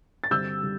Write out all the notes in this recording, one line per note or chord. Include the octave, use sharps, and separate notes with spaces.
A6
G2 D3 G3 C4 E6 G6
D3 G3